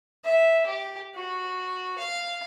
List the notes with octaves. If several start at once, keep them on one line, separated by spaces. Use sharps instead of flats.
E5
G4
F#4
F5